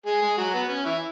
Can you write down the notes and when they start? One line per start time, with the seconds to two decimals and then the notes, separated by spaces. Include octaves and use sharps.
0.06 G#3 G#4
0.22 G#3 G#4
0.38 F#3 F#4
0.53 B3
0.69 C#4
0.85 E3 E4